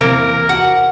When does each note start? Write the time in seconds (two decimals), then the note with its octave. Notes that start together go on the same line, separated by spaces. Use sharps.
0.01 E2 C3 A#3 A#4
0.49 F#4 F#5